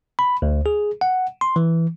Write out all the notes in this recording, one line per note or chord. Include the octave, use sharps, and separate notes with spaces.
B5
D2
G#4
F#5
C6
E3